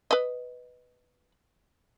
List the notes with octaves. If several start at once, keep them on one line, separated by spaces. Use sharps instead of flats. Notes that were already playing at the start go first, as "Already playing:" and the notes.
B4 D#5